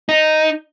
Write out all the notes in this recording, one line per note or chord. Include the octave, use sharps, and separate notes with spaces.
D#4